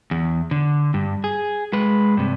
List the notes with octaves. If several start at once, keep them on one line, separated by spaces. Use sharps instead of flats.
E2
D3
G2
G#4
G#3 B4
G2 C3